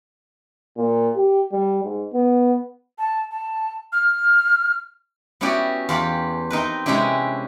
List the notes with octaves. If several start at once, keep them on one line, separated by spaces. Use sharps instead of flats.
A#2
G4
G3
G#2
B3
A5
A5
F6
B3 C#4 E4 F#4 G4 D5
E2 F4 G4 B5
C4 D#4 A#4 B4
C3 G#3 C#4 D4 E4 G4